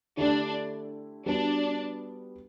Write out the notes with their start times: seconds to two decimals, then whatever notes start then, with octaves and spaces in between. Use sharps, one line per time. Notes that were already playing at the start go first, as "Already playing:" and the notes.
0.17 D3 A3 D4 E4 G4
1.26 G3 B3 D4 F#4 B4